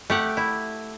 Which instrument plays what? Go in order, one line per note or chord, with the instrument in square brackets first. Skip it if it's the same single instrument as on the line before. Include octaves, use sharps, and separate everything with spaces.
[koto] A3 G4 F#5
E4